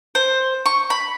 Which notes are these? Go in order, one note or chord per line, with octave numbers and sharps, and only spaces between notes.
C5
C#6
B5